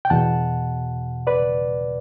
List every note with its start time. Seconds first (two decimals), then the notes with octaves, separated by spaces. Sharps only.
0.05 G5
0.10 E2 B2 F#5 A5
1.27 B4 D5